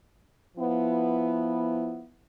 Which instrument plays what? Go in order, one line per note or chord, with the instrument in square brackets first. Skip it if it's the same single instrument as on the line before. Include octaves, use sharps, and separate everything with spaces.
[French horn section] F3 B3 E4